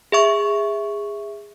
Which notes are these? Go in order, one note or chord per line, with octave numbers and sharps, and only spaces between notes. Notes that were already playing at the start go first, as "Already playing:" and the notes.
G#4 E5 C#6